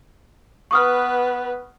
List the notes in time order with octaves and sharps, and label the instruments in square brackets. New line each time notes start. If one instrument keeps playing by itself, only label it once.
[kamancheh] B3 B4 [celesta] C#6 D#6 F6